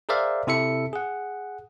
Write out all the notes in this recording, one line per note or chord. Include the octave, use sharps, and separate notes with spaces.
G#4 A#4 C5 D5 E5 F5
C3 E4 A4 E5 C#7
G#4 F#5